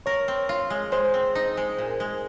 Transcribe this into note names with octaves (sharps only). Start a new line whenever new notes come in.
A#4 C#5
C4
F4
G#3
G#3 C5
C4
D#4
G#3
A#2
G#3